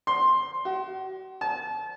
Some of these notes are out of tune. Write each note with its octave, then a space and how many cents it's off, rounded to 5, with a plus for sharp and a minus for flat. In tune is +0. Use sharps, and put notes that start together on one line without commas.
C6 +10
F#4 +40
A5 -30